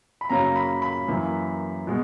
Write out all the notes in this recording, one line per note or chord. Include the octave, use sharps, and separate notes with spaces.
B5
F#2 C#3 F#3 A#3 C#4 A#5
B5
B5
F#2 E3 A#3
B2 G#3